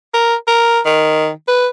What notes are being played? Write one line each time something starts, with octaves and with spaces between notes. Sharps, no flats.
A#4
A#4
D#3
B4